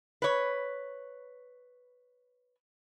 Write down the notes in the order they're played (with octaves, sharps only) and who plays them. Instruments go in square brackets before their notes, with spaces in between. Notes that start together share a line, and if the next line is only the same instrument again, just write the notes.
[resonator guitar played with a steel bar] B4 C#5